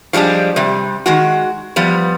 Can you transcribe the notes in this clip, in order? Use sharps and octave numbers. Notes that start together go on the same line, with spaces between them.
F3 G3 G#3 D4 G4
C3 G3
D#3 G#3 F#4
F3 G3 B3